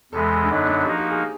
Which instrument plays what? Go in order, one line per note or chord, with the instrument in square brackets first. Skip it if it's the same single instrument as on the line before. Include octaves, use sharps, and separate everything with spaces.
[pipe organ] E2 C3 E3 G#3 [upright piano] A4
[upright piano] D4
[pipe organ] F#2 D3 F#3 B3 [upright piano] D#4
[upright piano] D4
[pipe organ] F3 A#3 D#4 F#4 [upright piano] G4
[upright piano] G4
G#4